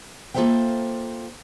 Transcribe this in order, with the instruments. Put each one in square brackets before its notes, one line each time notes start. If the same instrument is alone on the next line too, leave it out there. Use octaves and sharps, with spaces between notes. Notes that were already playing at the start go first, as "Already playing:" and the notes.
[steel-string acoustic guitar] A#3 F4 A4 C5 E5 G5